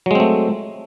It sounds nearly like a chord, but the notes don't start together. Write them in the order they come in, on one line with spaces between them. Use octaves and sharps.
F#3 G#3 C4 A3